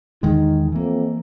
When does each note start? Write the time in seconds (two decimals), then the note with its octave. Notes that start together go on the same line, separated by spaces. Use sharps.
0.23 E2 D#3 G#3 D#4
0.72 F2 E3 A#3